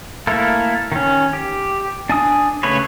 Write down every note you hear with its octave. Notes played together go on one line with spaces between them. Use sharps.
A3 A#3 E4 A4 A#4
D#3 C#4
G4
D4 G#5 D#6
C#3 A3 B4 C#5